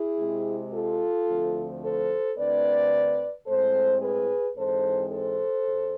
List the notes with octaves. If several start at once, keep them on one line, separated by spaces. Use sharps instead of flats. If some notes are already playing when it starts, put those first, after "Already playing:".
Already playing: E4 G#4
C3 G#3 C4
F4 A4
D2 D3 F3 A3 C4
A4 C5
D2 D3 A3 C4 B4 D5
A2 G#3 C4 A4 C5
G#4 B4
G#2 E3 G#3 C4 A4 C5
A4 C5
E2